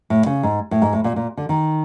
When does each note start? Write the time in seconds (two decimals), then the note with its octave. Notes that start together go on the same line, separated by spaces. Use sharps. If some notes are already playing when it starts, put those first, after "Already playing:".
0.10 A2
0.26 C#3
0.43 G#2
0.71 A2
0.82 G#2
0.93 A2
1.04 A#2
1.16 A#2
1.37 D3
1.49 D#3